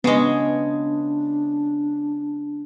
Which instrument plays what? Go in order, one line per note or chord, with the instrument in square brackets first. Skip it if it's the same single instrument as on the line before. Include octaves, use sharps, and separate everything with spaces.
[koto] C#3 G#3 [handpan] B3 [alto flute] D4